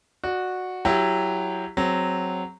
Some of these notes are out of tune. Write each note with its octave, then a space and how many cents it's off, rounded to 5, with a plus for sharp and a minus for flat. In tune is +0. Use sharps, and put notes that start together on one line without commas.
F#4 -10 D5 +20
F#3 +0 E4 +15 G4 +10
F#3 +0 C4 +0 G#4 +10